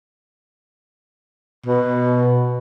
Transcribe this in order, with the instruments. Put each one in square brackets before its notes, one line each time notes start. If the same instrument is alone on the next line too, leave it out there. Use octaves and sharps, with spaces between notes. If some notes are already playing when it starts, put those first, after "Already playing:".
[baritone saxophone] B2